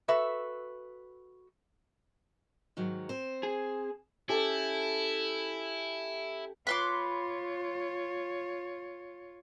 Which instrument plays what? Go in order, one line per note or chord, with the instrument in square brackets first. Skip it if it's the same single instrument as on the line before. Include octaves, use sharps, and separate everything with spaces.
[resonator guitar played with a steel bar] F#4 A4 B4 E5
[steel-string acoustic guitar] G#2 D#3 F#3
C4 C5
[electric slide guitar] G#4
[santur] C#4 G4 A4 [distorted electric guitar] E4
[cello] F4 C#5 [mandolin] B4 C6 D6